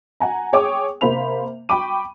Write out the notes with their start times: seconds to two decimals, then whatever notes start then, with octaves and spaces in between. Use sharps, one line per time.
0.20 F#5 G#5 A#5
0.53 G#4 C#5 G5 D6 D#6
1.01 C3 A#3 C5 B5 F7
1.69 G5 B5 C#6 D6 D#7